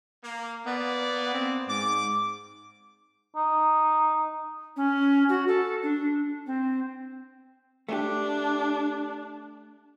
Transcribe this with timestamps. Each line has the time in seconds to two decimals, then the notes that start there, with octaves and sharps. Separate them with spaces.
0.22 A#3
0.66 A#3 B3 D5
1.34 C4
1.69 G#2 D6
3.36 D#4
4.76 C#4
5.29 F#4
5.48 A4
5.82 D4
6.46 C4
7.89 A3 D4 G4